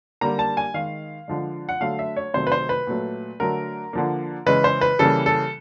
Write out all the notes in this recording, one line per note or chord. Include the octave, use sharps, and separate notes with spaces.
D3 G3 A#3 A#5
A5
G#5
D#3 G#3 F5
D3 F3 G#3
F#5
D3 F#3 A3 F5
E5
C#5
C3 D#3 F#3 A3 C5
B4
C5
B4
A#2 F#3 A3
D3 F#3 A3 A#4
D3 F3 A#3
C#3 E3 G#3 B4
C5
B4
C#3 E3 G3 A#3 A4
A4